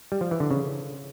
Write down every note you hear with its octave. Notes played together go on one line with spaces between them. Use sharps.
G3
F3
E3
D3
C#3